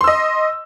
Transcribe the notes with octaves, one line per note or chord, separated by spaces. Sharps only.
D#5 C6 E6